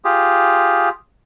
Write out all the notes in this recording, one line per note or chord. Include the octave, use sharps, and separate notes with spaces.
F4 G4 G#4